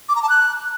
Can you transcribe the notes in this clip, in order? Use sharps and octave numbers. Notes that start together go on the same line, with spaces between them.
D6
A#5
A5
F#6